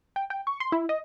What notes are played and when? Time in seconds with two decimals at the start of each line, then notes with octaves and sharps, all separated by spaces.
0.16 G5
0.30 G5
0.47 C#6
0.60 C6
0.72 E4
0.89 D#5